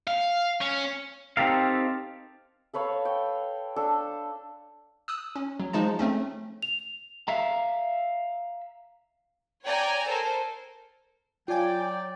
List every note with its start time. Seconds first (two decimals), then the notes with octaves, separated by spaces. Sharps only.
0.07 F5
0.61 C#4
1.37 C4 D#4 G4 A4 A#4 F5
2.73 A4 B4 C#5 F5
3.05 G5
3.76 D4 A4
5.08 D#6 E6 F#6
5.36 C#4
5.60 F#3
5.73 F3 G#3 D#4 A5
5.99 A3 C4 C#4
6.62 F7
7.28 E5 F5 A#5
9.65 C#5 D5 G5 G#5 A#5
10.08 A4 A#4 C5
11.48 F#3 F4 D5 G5 G#5